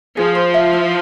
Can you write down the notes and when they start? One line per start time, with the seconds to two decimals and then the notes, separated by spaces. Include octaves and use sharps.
0.17 F3 G#4
0.35 C5
0.54 E5
0.73 E4